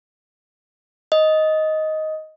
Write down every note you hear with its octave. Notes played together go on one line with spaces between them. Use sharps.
D#5